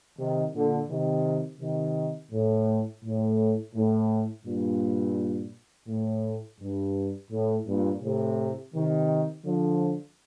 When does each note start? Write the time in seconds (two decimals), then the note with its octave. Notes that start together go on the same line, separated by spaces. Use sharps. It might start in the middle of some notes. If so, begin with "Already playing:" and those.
0.18 C3 D#3
0.54 A#2 D3
0.89 C3 D#3
1.60 C3 D#3
2.31 A2
3.04 A2
3.74 A2
4.45 G2 A#2
5.88 A2
6.60 G2
7.30 A2
7.66 G2 A#2
8.02 A2 C3
8.73 C3 D#3
9.44 D3 F3